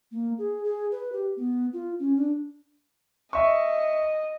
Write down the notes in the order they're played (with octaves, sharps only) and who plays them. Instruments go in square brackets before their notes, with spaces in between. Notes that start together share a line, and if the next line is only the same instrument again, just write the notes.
[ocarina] A#3
G#4
G#4
B4
G4
B3
F4
C#4
D4
[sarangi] D#5 [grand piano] E5 C#6